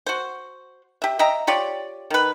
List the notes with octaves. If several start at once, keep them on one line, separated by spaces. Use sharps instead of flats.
F#4 C5
G4 E5
D#5 E5 G5 A#5
F4 G4 C#5 D5
D#3 B4